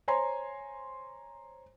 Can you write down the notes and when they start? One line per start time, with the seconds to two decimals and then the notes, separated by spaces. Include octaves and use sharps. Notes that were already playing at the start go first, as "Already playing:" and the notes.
0.08 C5 C#5 G#5 A#5 C6